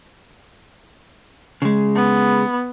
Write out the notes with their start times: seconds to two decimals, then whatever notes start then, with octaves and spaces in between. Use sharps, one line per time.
1.62 C#3 G#3
1.95 B3